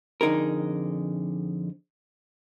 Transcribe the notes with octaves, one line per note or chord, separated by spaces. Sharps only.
F2 D3 D#4 G#4 A#4